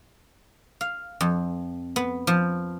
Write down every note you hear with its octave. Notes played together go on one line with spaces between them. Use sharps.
F5
F2
B3
F3